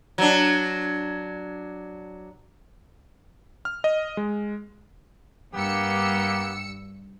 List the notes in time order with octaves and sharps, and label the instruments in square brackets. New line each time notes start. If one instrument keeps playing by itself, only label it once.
[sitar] F#3 D4
[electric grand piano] F6
D#5
G#3
[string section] G2 E6 C#7 [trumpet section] A#3 B3 G4